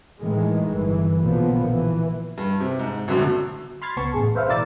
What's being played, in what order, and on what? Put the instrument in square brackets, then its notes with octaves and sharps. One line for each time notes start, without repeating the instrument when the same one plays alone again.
[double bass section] A2 D#3 E3 G#3
G1 E3
A#1 B2 D3 F3 A#3 B3
E3
[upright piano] G2
C3
G#2
A1 F#2 B2 D3
[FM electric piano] B5 C6 F6 G#6 A6 C7
C#2 B3 A5 C#6
A1 G#4
B4 C5 E5 F5
B2 E3 A#4 D5 E6 A6